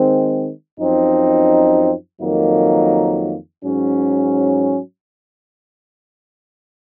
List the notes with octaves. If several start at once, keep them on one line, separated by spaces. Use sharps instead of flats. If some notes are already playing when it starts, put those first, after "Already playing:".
Already playing: D#3 G#3 C4
F#2 F3 C4 D#4
F2 D#3 F#3 A#3 D#4
G#2 F#3 C#4